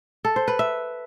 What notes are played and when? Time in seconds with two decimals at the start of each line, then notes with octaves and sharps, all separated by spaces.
0.24 A4
0.36 C5
0.48 B4
0.59 E5